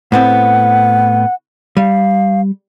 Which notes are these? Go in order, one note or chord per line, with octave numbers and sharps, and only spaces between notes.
A2 B3 C4 F#5
G3 F5